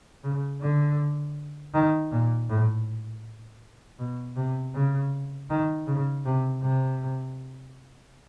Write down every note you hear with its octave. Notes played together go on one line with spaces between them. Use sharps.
C#3
D3
D#3
A#2
A2
B2
C3
C#3
D#3
C#3
C3
C3